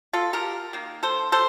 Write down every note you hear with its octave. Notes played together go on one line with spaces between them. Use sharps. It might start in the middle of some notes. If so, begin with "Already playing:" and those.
F4 A4
G4 A#4
D#3 A#3
A4 C5
A4 C5